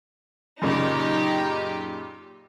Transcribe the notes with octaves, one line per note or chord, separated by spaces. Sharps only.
F#2 A#2 C#3 D#4 G4